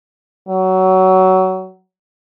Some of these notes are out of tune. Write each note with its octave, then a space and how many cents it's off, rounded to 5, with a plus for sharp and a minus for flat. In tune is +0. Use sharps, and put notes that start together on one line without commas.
F#3 +20